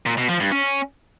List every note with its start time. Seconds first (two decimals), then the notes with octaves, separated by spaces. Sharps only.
0.06 A#2
0.17 B2
0.29 F3
0.40 G2
0.52 C#4